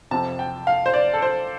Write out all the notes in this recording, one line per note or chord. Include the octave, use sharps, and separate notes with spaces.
F2 C3 F3 C4 A5
G5
F5
C5
D5
A4
C5